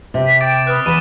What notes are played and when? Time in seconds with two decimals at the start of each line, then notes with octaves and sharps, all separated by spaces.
0.14 C3
0.27 B6
0.41 G5 D6 A6 D7
0.67 B4 D#6 F6 F#6
0.86 E2 B5 D#7 E7